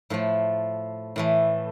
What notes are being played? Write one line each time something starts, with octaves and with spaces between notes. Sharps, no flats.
A2 F3 A3
A2 E3 A3